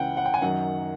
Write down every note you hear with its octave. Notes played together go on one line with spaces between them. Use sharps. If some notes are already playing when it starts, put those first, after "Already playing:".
Already playing: C#2 C#3 E3 F#5 G5
F#5
G5
G#5
F#2 D#3 F#3 F#5